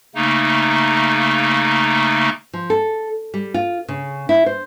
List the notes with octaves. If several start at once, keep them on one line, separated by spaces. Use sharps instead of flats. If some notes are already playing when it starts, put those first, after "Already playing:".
C#3 A3 A#3 D#4
F3
A4
G3
F4
C#3
E4
C5